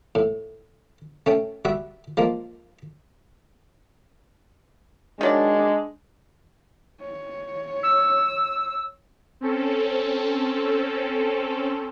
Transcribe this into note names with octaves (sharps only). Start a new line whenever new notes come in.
A2
A3 C#4 G5
G3 F#4 E5
F3 G#3 A#3
D#3 F#3 G#3 D4 D5
C#5
E6
C4 C#4 A4